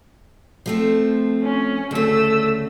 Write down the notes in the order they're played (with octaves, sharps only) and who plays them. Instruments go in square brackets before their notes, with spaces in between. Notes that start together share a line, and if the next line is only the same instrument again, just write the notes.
[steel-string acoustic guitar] F3 A3 C4
[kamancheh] C#4
[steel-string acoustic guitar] D2 C#3 [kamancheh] A3 E6